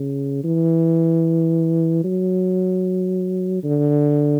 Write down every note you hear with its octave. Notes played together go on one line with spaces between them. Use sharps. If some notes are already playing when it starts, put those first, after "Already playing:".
Already playing: C#3
E3
F#3
D3